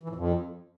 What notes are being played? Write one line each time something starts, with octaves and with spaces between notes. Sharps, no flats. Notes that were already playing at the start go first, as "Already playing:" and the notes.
E3
A2
F2